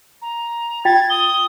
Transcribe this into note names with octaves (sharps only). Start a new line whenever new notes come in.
A#5
F4 G5 G#6 A6
D#6 G7